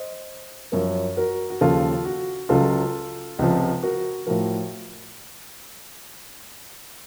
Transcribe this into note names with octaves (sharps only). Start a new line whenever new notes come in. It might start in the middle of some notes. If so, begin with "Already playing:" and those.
Already playing: C5 D#5
F#2 F3 A#4 C#5
F#4 A#4
F#4
D#2 C#3 F3 F4 A4
F#4
C#2 C#3 F#3 F4 A4
C#2 C3 F3
F#4 A#4
A2 F3 F#4 A#4